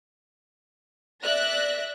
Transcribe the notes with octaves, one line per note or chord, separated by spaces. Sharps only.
D5 E5 F#6 A#6